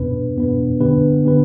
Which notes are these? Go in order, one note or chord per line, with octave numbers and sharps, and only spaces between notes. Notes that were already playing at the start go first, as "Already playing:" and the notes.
Already playing: E2 B2 B3 D4 B4
E2 B2 B3 D4 B4
D3 B3 D4 G4 B4
D3 B3 D4 G4 B4